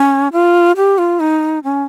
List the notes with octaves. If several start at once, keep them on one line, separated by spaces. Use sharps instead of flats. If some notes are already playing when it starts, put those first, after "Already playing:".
Already playing: C#4
F4
G4
F4
D#4
C#4